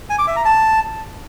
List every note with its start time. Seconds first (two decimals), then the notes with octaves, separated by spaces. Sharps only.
0.10 G#5
0.19 D6
0.27 E5
0.36 A#5
0.45 A5